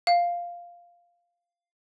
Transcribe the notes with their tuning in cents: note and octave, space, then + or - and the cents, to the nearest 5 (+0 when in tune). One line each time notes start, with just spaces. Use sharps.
F5 +0